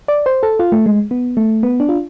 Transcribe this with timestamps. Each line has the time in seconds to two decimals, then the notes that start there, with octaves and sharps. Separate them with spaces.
0.08 D5
0.26 C5
0.43 A4
0.59 F4
0.72 A3
0.86 G#3
1.11 B3
1.37 A3
1.63 B3
1.80 D4
1.89 F4